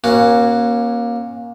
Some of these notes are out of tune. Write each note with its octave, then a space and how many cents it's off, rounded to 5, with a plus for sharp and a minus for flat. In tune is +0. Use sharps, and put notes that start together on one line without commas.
A#3 +20 C#4 -20 F#4 +0